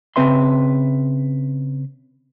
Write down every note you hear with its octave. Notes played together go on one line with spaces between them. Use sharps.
C#3 A3 C4 B4 E5 C6